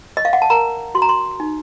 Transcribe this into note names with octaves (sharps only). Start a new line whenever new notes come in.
D#5
F5
F#5
A5
A#4 A#5
F#4 C6
A#5
C6
D#4